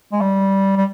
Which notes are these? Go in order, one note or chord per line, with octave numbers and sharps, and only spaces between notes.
G#3
G3
G3